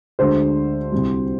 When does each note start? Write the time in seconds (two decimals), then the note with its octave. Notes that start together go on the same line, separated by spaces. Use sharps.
0.19 D2 D3 G#3 C5
0.92 C2 C3 G3